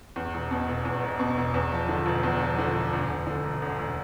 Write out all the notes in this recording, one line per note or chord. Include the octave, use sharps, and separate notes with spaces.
E2
E1
B2
E1
E2
E1
B2
E1
E2
F3
D3
E1
E2
F3
D3
E1
D2
E1
D3
E1
D2
E1